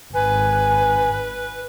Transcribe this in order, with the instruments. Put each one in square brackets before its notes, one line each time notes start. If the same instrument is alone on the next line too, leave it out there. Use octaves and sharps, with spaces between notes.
[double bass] G#1 [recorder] B4 [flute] G#5